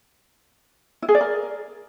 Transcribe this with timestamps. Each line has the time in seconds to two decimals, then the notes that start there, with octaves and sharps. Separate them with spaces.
1.02 E4
1.09 G#4
1.15 D5
1.21 A#4